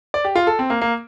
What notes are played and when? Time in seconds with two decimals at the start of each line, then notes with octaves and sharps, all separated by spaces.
0.14 D5
0.25 G4
0.36 F4
0.47 A4
0.59 C4
0.70 A#3
0.81 A#3